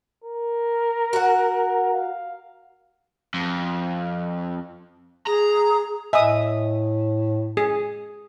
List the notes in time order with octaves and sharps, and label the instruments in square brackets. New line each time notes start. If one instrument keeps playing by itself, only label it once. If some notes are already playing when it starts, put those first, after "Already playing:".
[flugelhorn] A#4
[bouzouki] F#4 F#5
[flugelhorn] F5
[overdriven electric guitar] F2
[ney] G#4 [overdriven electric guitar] A#5
[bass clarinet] A2 [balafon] D#5 G#5 [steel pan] E5 D#6
[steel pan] G#4